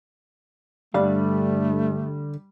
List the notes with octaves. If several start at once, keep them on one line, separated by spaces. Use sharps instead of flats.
G2 D3 G3 A3 F5